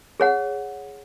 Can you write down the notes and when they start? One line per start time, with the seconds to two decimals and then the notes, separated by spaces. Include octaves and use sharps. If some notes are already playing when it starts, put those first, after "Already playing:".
0.20 G#4 C#5 F#5